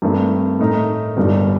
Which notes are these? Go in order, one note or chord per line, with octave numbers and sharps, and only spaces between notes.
G2 D#3 A3 C4
A2 A3 D#4 A#4
G1 G2 D#3 G3